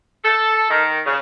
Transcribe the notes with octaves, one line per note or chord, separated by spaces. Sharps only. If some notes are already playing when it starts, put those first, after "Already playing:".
A4
D#3
C#3